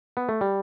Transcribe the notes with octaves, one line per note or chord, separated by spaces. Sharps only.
B3
A3
G3